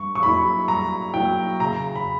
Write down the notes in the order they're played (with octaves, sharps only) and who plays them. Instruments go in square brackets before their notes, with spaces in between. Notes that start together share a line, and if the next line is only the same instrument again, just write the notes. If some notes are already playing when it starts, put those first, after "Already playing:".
Already playing: [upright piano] G2 C#6
C#6
F#3 A#3 E4 B5
G2 A#5
F#3 A#3 E4 G5
C#3 A#5
B5